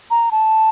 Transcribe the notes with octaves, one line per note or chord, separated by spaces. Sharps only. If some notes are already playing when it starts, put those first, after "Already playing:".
A#5
A5